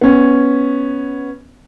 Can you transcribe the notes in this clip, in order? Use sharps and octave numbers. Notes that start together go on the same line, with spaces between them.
B3 C#4